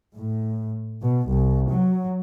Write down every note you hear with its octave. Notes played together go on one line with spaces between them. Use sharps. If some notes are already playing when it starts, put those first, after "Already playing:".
A2
B2
C2
F#3